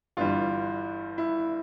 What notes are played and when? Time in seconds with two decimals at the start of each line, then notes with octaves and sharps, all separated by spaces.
0.17 G1 G2 E3 G3 F4
1.18 E4